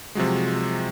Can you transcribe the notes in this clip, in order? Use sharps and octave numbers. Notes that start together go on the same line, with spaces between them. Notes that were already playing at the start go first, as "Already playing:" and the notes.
C3 F3 F#3 G#3